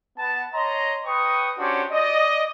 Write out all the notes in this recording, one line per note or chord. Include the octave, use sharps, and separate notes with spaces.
B3 A5
C#5 D#5 A#5 C6
B4 G5 C#6 D#6
C#4 D4 F#4 G4 C5
D5 D#5